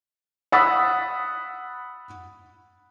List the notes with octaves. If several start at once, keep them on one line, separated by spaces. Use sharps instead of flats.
F#5 B5 D#6 E6 A6 B6